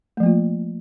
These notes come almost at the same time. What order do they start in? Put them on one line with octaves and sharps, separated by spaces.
A3 F3 A#3 F4